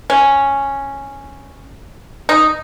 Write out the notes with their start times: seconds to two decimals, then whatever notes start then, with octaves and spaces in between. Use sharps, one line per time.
0.10 C#4
2.29 D#4